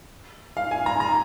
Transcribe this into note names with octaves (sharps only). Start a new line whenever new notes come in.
F5
G#5
A#5
A#5